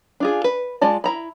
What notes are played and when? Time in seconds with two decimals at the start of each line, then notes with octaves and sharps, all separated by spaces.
0.20 D4 F4 G#4
0.44 B4
0.81 G#3 F4 D5 A5
1.04 E4 A#5 B5